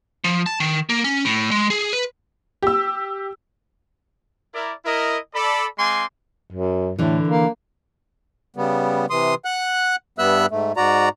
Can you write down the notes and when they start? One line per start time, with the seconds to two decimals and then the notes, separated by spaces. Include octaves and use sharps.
0.24 F3
0.46 A5
0.60 D#3
0.89 A#3
1.04 C#4
1.25 A2
1.51 G#3
1.70 G#4
1.93 B4
2.62 G4 E6
4.54 E4 A#4 D5
4.85 E4 A#4 D#5
5.34 A4 D5 B5
5.78 G#3 C4 F5 G#5 C6 D6
6.52 F#2
6.99 A2 D3 E3
7.28 A#3
8.56 C#3 G3 B3
9.10 C3 E3 C6 D#6
9.45 F#5 F#6
10.19 G2 G3 B3 E5 E6 F#6
10.51 G#2 A3
10.77 G#2 F#4 D5 A#5